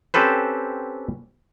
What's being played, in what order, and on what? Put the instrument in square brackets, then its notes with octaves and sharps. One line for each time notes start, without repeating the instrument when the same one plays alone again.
[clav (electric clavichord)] C4 C#4 G4 A4 B4 C5